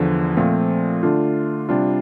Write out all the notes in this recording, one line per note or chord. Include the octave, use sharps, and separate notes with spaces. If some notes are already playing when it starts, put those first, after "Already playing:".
Already playing: E2 D3 F3
A#2 F3 A3 C4 F4
D3 A3 D4 F4
C3 G3 D4 F4